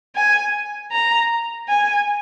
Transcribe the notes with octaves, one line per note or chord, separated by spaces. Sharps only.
G#5
A#5
G#5